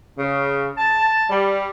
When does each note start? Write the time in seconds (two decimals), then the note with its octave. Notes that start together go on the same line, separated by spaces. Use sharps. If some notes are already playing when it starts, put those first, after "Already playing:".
0.19 C#3
0.77 A5
1.30 G3